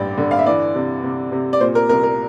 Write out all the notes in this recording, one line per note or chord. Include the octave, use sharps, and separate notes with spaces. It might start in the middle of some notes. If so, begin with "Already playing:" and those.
Already playing: A1 G2 D3 D5 G5
D3
F5
E5
E3 D5
C3
C3
C3
D5
A#2 C5
A#4
C2 A#4
A#4